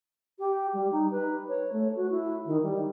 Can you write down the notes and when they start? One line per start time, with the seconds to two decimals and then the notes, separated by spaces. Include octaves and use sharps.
0.39 G4
0.73 G3
0.91 D#4
1.10 B4
1.48 C#5
1.72 A3
1.95 F#4
2.10 E4
2.45 D#3
2.62 G3